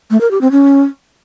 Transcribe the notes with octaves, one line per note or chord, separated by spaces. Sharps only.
A3
A#4
G4
C4
C#4